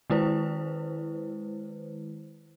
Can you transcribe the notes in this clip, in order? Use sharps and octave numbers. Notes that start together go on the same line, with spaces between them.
D#3 G#3 E4 B4 C5